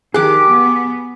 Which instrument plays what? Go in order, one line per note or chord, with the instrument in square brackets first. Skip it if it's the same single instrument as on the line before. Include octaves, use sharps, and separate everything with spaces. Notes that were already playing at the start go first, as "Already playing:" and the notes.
[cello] D#3 G4 [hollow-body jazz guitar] G#4 [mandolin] D6 F#6
[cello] B3